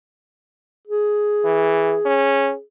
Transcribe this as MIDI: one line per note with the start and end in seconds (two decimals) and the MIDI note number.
0.87 2.61 68
1.45 1.95 52
2.05 2.52 61